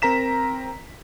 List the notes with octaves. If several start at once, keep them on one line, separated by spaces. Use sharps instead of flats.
C4 A#4 A#5 B6 E7